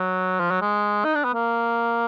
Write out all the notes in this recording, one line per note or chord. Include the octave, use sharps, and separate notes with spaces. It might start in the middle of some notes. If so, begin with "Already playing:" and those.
Already playing: F#3
F3
F#3
G#3
D#4
D4
B3
A#3